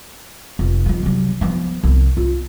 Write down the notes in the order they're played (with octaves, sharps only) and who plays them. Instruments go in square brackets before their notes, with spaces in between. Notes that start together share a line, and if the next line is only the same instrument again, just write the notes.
[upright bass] F1
D#3 F3
C3 F#3
F3 B3
C2
F4